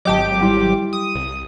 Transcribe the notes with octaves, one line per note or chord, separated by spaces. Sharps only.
G#1 F#3 G4 D#5 G5 A5 D6
G3 E4 C6
D#6
C2